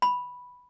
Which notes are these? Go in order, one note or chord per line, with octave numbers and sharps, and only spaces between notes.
B5